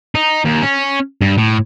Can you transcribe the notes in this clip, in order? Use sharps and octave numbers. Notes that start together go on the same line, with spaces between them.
D#4
D#2
C#4
G2
A2